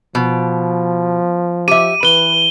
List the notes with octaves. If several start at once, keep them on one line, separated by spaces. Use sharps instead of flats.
B2 F3
G4 E5 D#7
E3 B4 D#7 G7